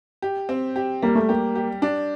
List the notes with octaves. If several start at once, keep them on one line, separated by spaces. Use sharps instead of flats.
G4
C4
G4
G3 A#3
A3
A#3 G4
G4
D4